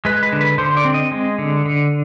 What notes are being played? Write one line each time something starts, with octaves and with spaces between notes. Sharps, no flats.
G#3 B4
B4
D3
B4
D3 C5
D5
C4
D#5
G#3
D3
D3